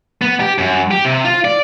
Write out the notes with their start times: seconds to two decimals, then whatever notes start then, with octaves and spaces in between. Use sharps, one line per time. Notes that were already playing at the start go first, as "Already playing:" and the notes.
0.22 B3
0.40 G4
0.58 F#2
0.91 G4
1.05 C3
1.25 F4
1.45 D5